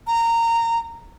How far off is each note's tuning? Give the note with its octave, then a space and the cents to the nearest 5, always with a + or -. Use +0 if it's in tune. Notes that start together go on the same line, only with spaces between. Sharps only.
A#5 -15